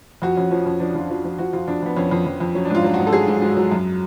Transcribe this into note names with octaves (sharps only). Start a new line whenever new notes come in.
F2 F#4
F2 C#4
F3 C#4
F2 C#4
F3 D4
F2 F4
F3 F#4
F3
F3 F#4
F2 F4
F2 D4
F2 B3
F2 C#4
F2
F2
F2
F#3 C#4
D4
G#2 F4
F#3
F#4
G#2
A4
F#3 G#4
G#2
G#2
F#3
F#2